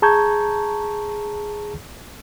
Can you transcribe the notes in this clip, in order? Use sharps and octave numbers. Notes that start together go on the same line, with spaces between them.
G#4 A5 A#5 C#6 G6 G#6